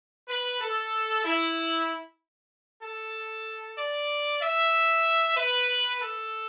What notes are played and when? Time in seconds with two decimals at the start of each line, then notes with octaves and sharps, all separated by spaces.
0.28 B4
0.61 A4
1.24 E4
2.83 A4
3.78 D5
4.42 E5
5.37 B4
6.00 A4